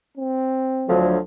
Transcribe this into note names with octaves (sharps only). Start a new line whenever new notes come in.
C4
D2 F3 F#3